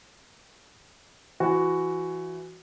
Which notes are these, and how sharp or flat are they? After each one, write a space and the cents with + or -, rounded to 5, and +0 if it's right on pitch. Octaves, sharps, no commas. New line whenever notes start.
E3 +20 F#4 +0